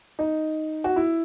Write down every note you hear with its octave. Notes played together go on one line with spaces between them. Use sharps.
D#4
F#4
E4